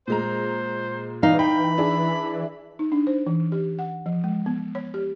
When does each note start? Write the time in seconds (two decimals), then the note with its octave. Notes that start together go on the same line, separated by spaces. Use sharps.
0.08 A#2 G#3 C5 A#5
1.23 E3 D#4 F5
1.39 G5 B5
1.78 D4 E4 G#4
2.79 D#4
2.92 D4
3.07 C5
3.27 E3
3.52 G4
3.79 F#5
4.06 F3
4.24 G#3
4.46 B3
4.75 C#5
4.94 G4